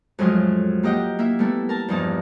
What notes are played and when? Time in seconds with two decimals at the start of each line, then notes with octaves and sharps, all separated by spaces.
0.19 F2 A2 F#3 G#3 F4
0.83 A#3 G4 D#5 F#5 G5
1.19 A#3 E4 E5
1.39 G3 A3 B3 E4 A4
1.69 A#4 A5
1.88 E2 G2 F3 D#4 A5